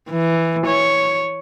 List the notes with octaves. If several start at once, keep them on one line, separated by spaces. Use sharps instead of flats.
E3
C#5